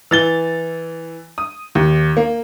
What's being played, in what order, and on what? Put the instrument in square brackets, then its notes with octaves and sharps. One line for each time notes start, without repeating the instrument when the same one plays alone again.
[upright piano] E3 A6 G7
D#6
D#2
A#3